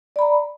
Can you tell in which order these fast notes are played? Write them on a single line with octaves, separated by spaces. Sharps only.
D5 B5 A#5